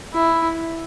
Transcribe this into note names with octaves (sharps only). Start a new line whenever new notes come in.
E4